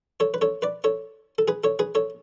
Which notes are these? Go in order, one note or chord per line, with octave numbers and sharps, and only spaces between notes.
A4 C#5
B4
A4 C#5
B4 D5
A4 C#5
A4
G#4 B4
A4 C#5
G#4 B4
A4 C#5